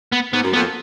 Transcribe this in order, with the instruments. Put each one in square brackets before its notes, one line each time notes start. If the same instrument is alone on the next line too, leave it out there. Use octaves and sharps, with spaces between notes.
[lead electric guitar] B3
[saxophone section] G#2 [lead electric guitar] B3
[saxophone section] F#2
[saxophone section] F2 [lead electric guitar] B3